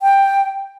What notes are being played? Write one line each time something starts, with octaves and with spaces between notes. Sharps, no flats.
G5